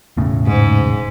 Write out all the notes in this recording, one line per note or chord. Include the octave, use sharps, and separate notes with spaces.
E1 A2 C#3
G#2